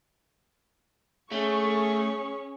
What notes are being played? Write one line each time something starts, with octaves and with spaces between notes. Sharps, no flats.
A3 C#4 G#4 C#6